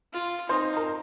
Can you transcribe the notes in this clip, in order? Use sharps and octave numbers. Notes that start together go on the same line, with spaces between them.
F4
D#4 C5 C6
A#4 A#5